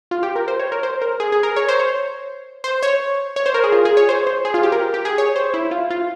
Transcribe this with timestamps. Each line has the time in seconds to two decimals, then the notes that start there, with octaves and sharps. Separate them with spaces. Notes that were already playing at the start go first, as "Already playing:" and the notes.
0.11 F4
0.23 G4
0.36 A#4
0.48 C5
0.59 C#5
0.72 A#4
0.83 C5
1.02 A#4
1.20 G#4
1.32 G#4
1.43 A#4
1.56 C#5
1.69 C5
1.79 C#5
2.64 C5
2.83 C#5
3.36 C#5
3.46 C5
3.54 A#4
3.64 G#4
3.72 F4
3.85 G#4
3.97 C#5
4.09 C5
4.27 C5
4.45 G#4
4.54 F4
4.63 G4
4.72 A#4
4.94 G4
5.05 G#4
5.18 C#5
5.36 C5
5.54 E4
5.71 F4
5.91 F4